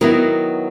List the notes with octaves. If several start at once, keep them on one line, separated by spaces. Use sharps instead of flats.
D#3 F#3 B3 E4 A#4